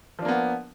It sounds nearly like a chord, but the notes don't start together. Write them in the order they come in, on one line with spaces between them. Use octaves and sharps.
F3 D4 A#3 B3